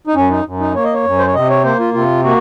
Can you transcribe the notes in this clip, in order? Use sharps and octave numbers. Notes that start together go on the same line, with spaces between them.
D#4
F#2 C#4
D#4
F#2
D#4
A#3 C#5
D#5
C#5
F#2
C5
C#5
C3 D#5
C#5
A#3 C5
F4
C3 F4
A#3 F#4